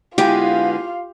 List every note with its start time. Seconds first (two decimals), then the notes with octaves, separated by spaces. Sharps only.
0.18 D3 G#3 B3 E4 F4 G4 F5 G#5